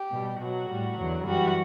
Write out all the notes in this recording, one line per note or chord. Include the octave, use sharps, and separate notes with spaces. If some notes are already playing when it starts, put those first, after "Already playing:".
Already playing: G4
B2 G3
B2 F#3 F#4
A2 G3
E2 D3 F#3
F#2 E3 G3 F#4